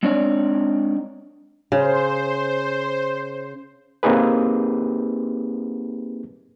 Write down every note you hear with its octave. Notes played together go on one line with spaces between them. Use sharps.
G#3 C4 D4 D#4 C#5 D5
C#3 C5
A#3 C4 D#4 G4 G#4 B4